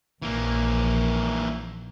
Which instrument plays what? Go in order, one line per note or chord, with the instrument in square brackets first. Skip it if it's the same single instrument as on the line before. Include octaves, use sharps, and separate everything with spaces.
[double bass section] A#1 [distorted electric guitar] E3 A#3